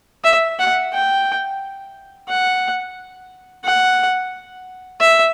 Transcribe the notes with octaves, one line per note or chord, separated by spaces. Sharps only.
E5
F#5
G5
F#5
F#5
E5